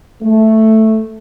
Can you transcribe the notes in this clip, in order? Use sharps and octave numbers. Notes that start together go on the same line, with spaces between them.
A3